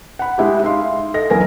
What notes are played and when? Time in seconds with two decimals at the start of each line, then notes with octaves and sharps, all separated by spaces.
0.19 F#5 B5
0.38 G#3 E4 G4
0.63 D#4 E5 F5 C6
1.14 A4 D#5 A#6
1.30 B1 E2 A#4 G#5 A#6